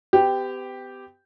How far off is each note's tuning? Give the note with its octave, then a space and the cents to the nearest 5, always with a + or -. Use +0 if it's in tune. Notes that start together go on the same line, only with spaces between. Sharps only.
B3 +40 G4 +0